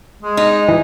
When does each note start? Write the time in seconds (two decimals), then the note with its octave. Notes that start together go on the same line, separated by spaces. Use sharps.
0.22 G#3
0.37 D#4
0.69 E3